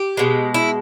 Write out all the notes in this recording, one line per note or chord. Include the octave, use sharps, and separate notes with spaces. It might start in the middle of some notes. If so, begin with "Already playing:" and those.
Already playing: G4
B2 G#3
E4